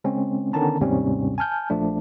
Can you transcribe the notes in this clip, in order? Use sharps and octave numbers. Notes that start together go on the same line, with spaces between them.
C#3 G#3 C4 C#4
D3 D#3 B3 C#4 A5 A#5
D#2 G#2 C3 G3 C4 C#4
G#5 A5 F6 G6
A#1 F3 A3 D4